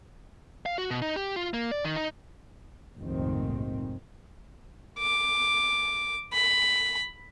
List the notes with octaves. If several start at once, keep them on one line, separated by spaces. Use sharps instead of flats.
F5
F#4
B2
D#4
G4
F4
A#3
D5
D#3
D#4
F1 A#1 G#2 D#3 C4
D6
B5